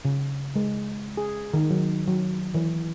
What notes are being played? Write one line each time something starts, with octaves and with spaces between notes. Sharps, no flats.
C#3
G#3
G#4
D#3
F#3
F#3
E3